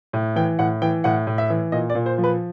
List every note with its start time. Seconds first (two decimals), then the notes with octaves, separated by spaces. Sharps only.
0.13 A2
0.36 E3 G5
0.59 A2 F#5
0.82 E3 G5
1.04 A2 F#5
1.27 A2
1.38 E5
1.50 E3
1.72 A#2 D#5
1.90 D5
1.95 A#2
2.06 C5
2.18 F3
2.24 B4